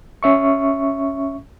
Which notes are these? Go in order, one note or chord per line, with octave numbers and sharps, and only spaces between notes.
C#4 E5 C#6